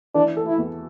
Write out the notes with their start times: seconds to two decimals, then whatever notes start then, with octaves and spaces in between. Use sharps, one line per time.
0.15 E3 D4
0.37 A4
0.47 E4
0.58 E2